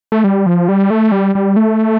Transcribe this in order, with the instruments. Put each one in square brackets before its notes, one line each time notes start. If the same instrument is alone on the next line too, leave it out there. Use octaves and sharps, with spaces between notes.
[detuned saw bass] A3
G3
F3
G3
A3
G3
G3
A3